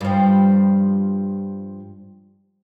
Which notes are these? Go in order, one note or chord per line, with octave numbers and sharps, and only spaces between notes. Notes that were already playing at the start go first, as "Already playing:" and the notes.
G2 F3